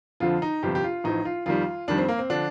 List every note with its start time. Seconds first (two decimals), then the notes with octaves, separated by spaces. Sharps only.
0.20 F2 D3 F3 F4
0.42 D#4
0.63 G1 F2 C3 G4
0.75 G4
0.83 F4
1.04 A1 A2 F3 D#4
1.25 F4
1.46 F2 D#3 G3 F4
1.88 F2 D#3 G3 D4
1.98 C4
2.09 A#3
2.19 C4
2.30 D3 F3 D4